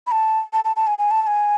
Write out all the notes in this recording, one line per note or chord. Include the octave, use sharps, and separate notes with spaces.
B5
A5
A5
A5
A5
G#5
G#5
A5
A5
G#5